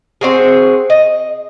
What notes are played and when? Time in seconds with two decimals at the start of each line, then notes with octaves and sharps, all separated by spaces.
0.21 C4 F#4 G#4
0.90 D#5